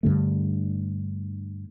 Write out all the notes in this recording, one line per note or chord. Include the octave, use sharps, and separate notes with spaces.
G2 D3 A3